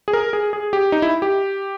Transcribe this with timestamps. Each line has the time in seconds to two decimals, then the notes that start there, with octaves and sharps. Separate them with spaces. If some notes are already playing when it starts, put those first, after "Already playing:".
0.08 G#4
0.13 A#4
0.33 G#4
0.53 G#4
0.73 G4
0.92 D#4
1.02 E4
1.22 G4